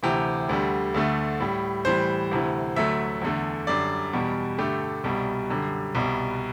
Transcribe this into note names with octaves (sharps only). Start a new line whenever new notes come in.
D2 C3 E3 G4
D2 D3 G3
D2 D3 A3
A2 G3
A2 E3 G3 C5
D2 C3 E3
D2 D3 F#3 A3 E5
E2 D3 A3
F#2 D3 G3 D5
E2 B2 G3
G2 D3 A3 G4
C2 B2 G3
F#2 D3 G3
C2 B2 G3